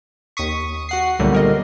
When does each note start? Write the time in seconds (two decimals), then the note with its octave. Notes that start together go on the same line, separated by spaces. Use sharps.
0.37 D#2 C#6 D#6 B6
0.89 F#4 F#5 C7
1.19 C#2 A#2 D3 F#3 G3 A3
1.33 B3 A#4 D#5